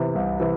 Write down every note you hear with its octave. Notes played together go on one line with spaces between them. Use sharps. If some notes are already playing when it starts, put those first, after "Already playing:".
Already playing: C3 E3
C2
C3 E3